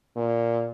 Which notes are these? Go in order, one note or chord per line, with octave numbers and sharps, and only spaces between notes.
A#2